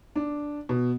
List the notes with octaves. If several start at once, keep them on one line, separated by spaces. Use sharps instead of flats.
D4
B2